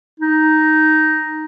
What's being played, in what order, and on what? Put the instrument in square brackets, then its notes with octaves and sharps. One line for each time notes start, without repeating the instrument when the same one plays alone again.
[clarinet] D#4